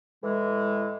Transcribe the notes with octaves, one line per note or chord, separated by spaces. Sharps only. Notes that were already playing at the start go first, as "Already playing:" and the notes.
A2 E3 G#3